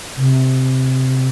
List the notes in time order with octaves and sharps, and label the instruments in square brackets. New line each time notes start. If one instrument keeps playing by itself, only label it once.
[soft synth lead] C3